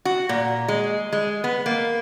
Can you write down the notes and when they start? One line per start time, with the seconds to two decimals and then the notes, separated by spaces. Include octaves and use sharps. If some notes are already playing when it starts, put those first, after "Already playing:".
0.05 F#4
0.29 A#2
0.68 G#3
1.13 G#3
1.44 B3
1.66 A#3